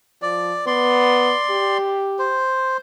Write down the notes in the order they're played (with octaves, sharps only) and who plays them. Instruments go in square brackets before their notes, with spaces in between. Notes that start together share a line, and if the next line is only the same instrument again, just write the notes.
[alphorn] F3 [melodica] D5
[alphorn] B3 [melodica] D5 C6
[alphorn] G4
[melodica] C5